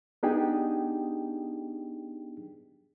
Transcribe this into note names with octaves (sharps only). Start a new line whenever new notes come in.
B3 D4 D#4 G4 G#4 G5